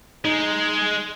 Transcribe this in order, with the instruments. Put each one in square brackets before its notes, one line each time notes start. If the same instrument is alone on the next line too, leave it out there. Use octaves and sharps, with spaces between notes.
[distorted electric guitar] G#3 [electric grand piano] D#4